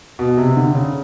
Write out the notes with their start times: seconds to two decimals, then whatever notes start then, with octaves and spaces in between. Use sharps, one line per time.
0.19 B2
0.37 C3
0.57 D3
0.75 C#3